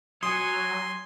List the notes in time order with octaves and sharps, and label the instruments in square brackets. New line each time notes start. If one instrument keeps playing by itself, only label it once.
[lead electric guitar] F#3 [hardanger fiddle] G#5 [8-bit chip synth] C6 [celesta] D#6